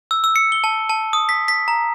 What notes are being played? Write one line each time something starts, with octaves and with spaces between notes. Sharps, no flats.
E6
E6
C#7
G7
A5
A5
D#6
B6
B6
A#5